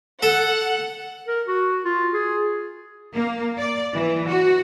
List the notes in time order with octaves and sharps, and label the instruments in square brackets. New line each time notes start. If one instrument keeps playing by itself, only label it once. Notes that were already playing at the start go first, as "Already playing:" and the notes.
[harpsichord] A4 [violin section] F#5
[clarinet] A#4
F#4
F4
G#4
[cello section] A#3
D5
E3
F#4